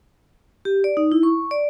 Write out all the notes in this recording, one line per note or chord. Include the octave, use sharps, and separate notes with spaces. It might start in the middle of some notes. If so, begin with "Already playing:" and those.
G4
D5
D#4
E4
C#6
D5